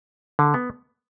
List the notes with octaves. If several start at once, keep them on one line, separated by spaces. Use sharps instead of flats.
D3
B3